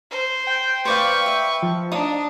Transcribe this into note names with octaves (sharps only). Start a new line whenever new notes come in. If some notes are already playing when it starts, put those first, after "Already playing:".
C5
G5
B4 C5 D5 F5 C#6
E5
F3
D4 D#4 D#5 D#6